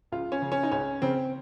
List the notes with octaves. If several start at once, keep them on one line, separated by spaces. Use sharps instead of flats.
C#2 F4
C#4
C#3
C#4
D#4
C#2 C#4
C#3 C4